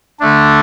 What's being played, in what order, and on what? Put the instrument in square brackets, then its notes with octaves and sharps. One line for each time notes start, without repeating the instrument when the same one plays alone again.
[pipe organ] D3 A3 D4